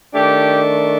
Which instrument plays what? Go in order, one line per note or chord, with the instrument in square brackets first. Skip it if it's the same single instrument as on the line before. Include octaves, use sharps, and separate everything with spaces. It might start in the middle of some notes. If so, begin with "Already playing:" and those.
[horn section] D#3 A3 D4 G4